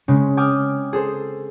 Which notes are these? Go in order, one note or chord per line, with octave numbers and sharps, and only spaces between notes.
C#3 G#3 C4 C#4
G5 G#5 D6 D#6 F6
G#4 A4 C5